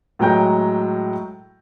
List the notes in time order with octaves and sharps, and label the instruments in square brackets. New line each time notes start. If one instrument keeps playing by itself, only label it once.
[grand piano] A2 F#3 G#3 G5 A#5 G6